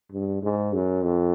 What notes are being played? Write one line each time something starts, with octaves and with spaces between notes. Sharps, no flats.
G2
G#2
F#2
F2